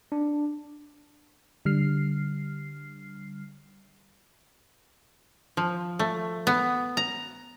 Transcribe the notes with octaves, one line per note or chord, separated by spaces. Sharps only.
D4
D3 G3 F6 C7
F3
A3
B3
A#5